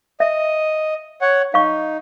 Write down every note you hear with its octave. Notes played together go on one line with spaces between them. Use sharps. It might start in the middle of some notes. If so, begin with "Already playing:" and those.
D#5 E5
C#5 F#5
D#4 F5 C#6